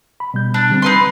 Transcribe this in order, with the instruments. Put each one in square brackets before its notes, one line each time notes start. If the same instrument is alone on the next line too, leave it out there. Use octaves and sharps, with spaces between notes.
[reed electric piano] B5
B2 G3 G6
[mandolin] D4
[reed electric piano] D3 G3 C4
[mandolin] D#4 B4 C6